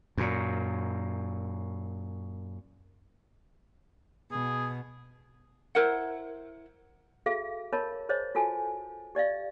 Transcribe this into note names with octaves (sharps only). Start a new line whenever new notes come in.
F#2 A#2
B2 G#4
E4 A#4 C5 F#5
F#4 G#4 A4 E5 F5
A#4 C#5 D#5 A5 B5
G#4 C5 C#5 D#5
F4 F#4 A4 G#5 A5
G4 D5 D#5 F5